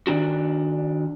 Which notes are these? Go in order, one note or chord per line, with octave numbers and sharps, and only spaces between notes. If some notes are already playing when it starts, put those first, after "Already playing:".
D#3 D4 F#4